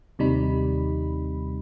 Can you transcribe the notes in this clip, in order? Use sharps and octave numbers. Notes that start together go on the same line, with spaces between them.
D#2 C3 G3 D#4 B5